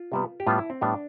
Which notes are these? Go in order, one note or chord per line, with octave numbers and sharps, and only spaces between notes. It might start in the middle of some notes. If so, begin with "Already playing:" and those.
Already playing: F4
C3 G3 B3
G4
A2 G3 B3 F4
E4
C4
A2 G3 B3 D4